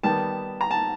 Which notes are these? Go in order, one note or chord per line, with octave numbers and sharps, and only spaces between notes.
D#3 G3 B3 A5
A#5
A5